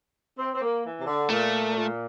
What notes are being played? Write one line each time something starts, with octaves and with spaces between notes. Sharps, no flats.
C4
C4
A#3
E3
C3
D3
A#2 A3
A#2